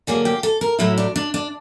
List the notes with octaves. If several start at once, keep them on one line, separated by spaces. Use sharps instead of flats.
D3 F#3 A#3 G#4
G4
A4
A#4
A2 F#3 A3 E4
D4
D4
D4